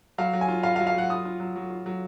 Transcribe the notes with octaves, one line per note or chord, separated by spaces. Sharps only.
F#3 F5
F#3
G#5
F4
F4 F5
F5
F#3
F5
F#3 F#5
F4 D#6
F4
F#3
F#3
F4
F#3